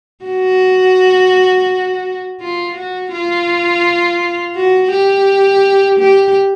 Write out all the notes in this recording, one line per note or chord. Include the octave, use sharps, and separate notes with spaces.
F#4
F4
F#4
F4
F#4
G4
G4